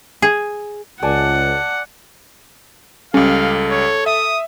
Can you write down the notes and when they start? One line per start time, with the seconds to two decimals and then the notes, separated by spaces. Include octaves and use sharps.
0.22 G#4
1.02 C#2 D5 F#5 G#5 A5
3.14 C#2 G3 C#4 A4 F5
3.71 C#5
4.06 E5 D#6